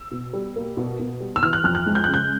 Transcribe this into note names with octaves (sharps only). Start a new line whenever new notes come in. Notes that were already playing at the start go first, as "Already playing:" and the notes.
Already playing: E6
B2
G3
A#3
B2
B2
G3
E6
E3 F6
F#6
F2 F6
F#6
G#3
G6
C#3 F#6
G6